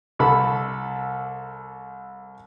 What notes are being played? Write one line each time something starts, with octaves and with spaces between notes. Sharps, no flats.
C2 A4 B5